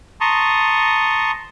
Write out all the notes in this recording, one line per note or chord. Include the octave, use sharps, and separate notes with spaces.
A5 A#5 C6 C#6 D#6